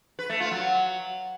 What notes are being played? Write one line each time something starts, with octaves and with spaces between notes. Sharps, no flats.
B4
A3
F4
F#3